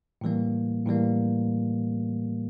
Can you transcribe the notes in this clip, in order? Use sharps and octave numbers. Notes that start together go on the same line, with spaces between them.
A2 E3 G3 A#3
A2 E3 G3 A#3